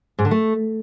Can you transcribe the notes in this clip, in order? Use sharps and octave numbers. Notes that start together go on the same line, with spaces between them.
G#2
D3
A3